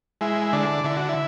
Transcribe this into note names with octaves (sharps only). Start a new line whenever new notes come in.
G#3 E4
D3 D4
D3 E4
F#4
E4